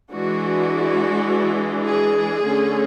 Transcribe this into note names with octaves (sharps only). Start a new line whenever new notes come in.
E3 G#3 D4 F#4
G#4
D3 A3 C#4